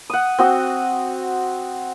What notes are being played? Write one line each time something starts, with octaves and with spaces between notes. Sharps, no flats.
F#5 D#6
C4 F#4 D#6